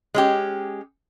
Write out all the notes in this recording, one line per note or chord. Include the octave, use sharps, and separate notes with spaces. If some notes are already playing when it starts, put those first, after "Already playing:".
G#3 C#4 G4